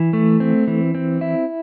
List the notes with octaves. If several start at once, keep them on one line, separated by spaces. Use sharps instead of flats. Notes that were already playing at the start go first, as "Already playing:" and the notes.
Already playing: E3
A3
C4
E3
C4
E4